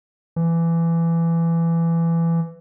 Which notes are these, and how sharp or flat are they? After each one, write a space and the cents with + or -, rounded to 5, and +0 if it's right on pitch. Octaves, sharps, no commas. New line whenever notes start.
E3 +20